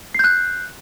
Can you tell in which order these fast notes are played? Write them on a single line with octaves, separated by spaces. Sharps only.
C7 G6 F#6